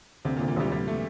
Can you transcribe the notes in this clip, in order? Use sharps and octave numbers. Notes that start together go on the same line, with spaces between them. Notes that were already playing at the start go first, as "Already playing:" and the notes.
D2 C3
A#2
D2
A#2
D2 G3
D2 G3
A3